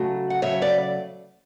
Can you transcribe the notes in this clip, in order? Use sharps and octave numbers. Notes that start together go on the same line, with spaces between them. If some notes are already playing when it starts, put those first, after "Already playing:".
Already playing: C#3 F#3 A3
F#5
C#3 F#3 A3 C#5 E5
B4 D5